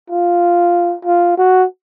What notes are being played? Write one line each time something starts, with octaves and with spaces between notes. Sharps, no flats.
F4
F4
F#4